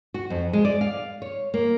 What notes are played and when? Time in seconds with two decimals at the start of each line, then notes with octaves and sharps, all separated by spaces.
0.14 F#4
0.30 F2
0.53 G#3
0.65 D5
0.81 F5
1.22 C#5
1.54 A#3